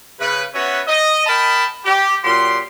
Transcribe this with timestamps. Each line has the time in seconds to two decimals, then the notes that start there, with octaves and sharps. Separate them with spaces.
0.20 C#3 B4
0.54 B3 C#4 F#4 B4 C#5 E5
0.88 D#5
1.26 A#4 D#5 G5 A5 B5
1.85 G4
2.24 A#2 F#3 G4 C6